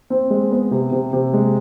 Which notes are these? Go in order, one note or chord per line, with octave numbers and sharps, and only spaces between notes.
C4
G#3
B3
C3
C3
C3
G#3